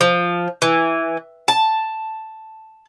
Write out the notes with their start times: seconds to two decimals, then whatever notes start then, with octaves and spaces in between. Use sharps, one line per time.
0.01 F3
0.62 E3
1.48 A5